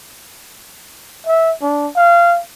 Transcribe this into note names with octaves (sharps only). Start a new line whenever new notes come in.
E5
D4
F5